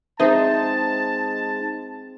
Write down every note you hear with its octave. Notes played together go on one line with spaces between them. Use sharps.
G#3 C4 D#4 G#4 C5 E5 A5